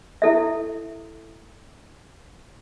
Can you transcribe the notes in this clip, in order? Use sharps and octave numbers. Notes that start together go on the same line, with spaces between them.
E4 A4 E5